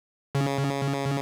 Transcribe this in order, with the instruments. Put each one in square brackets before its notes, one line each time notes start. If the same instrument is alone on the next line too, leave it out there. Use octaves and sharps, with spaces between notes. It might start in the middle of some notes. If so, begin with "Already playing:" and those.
[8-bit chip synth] C#3